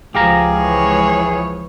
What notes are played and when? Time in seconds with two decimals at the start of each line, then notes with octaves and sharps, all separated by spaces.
0.15 C#2 F3 G4 G#4 F5 A#5
0.58 E3 C#5